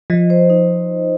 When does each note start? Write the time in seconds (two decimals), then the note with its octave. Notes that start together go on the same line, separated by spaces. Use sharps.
0.10 F3 D#5
0.30 C5
0.50 D#4